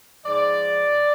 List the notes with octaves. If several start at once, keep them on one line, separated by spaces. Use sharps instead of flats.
G#2 F3 D5